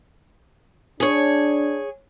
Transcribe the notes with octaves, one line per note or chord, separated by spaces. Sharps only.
D4 G#4 C#5